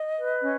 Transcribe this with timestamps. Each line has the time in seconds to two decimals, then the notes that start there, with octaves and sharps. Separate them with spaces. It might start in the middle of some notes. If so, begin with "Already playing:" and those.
Already playing: D#5
0.16 B4
0.42 C#4